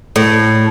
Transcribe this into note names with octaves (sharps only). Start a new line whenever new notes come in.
A2